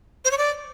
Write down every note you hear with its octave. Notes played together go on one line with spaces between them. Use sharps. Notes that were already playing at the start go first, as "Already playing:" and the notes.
C5
C#5
D5